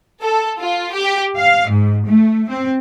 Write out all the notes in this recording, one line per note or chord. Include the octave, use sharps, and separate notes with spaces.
A4
F4
G4
F5
G#2
A3
C4